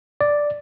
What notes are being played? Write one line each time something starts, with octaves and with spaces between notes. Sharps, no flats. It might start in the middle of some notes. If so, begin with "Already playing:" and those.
D5